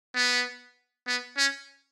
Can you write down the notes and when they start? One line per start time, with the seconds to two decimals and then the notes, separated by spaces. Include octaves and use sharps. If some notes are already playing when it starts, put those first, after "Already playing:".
0.15 B3
1.07 B3
1.37 C#4